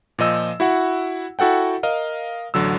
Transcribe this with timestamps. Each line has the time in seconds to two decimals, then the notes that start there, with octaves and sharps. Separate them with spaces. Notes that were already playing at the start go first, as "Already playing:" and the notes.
0.19 A#2 F3 D#5 E6
0.60 E4 F#4 F#5
1.39 E4 F#4 A4 F#5 G5
1.83 A#4 D#5 F5
2.54 A1 D3 F#3 E6